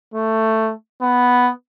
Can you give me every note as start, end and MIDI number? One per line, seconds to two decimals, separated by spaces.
0.14 0.72 57
1.02 1.51 59